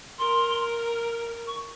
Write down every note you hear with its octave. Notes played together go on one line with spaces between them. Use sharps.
A#4 C6
C#6